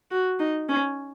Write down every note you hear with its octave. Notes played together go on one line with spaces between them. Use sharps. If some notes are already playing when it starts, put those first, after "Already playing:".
F#4
D#4
C#4